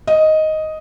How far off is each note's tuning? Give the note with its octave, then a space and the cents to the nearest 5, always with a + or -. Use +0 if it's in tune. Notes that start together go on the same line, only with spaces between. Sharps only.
D#5 +5